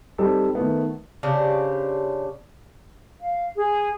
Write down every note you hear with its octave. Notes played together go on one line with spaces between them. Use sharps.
G3 C4 D#4 G4 A4
D#3 A3 B3
C#3 D4 G4 C5
F5
G#4